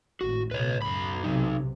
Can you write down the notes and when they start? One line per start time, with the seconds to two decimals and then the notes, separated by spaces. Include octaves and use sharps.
0.21 G#1 A2 F#4
0.51 C#2 B2 B4 C#5
0.82 B1 F#2 B5
1.24 B1 C3 F#3 D#4